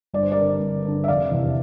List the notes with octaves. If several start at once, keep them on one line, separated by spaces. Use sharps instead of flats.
G1 D5
C5
A#4 D5
G2 D3
G1
G2 D3
E5
F1 D5 F5
E2 C3 E3